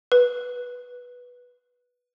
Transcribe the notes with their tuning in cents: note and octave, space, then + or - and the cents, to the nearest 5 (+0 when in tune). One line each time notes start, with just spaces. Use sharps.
B4 -10